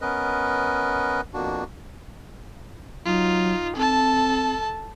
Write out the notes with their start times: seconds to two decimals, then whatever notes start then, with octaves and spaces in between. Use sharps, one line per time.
0.01 B3 C#4 A#4 B4 D#5
1.34 F2 B2 A#3 D4 F#4
3.06 F#3 D#4 F4
3.76 C4 A4 A5